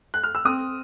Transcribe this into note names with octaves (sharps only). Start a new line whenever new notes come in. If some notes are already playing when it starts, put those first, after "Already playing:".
F#6
F6
E6
C4 D#6